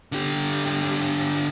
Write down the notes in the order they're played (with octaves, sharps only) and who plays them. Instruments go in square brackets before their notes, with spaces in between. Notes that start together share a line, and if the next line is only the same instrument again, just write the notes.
[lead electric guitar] D3 G4